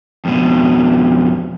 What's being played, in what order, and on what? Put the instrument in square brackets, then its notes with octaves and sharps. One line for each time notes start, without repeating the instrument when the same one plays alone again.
[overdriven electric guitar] F2 B2